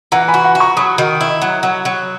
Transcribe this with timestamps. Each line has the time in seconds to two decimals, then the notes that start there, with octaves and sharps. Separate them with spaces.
0.12 E3 F#5 A#5
0.28 G#5 B5
0.34 F#4
0.44 F#5 A#5
0.55 F#4
0.60 A#5 C#6
0.76 F#3 B5 D#6
0.98 D#3
1.21 E4
1.42 F#3
1.63 F#3
1.85 F#3